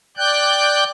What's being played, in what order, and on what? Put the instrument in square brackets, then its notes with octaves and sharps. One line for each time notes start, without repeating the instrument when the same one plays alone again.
[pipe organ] D5 G5 F#6 G6